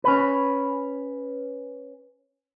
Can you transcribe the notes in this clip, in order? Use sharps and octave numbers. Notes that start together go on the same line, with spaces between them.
C#4 B4